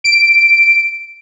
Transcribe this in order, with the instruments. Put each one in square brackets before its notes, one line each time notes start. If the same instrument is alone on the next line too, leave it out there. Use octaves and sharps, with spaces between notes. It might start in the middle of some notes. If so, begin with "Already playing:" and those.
[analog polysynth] D7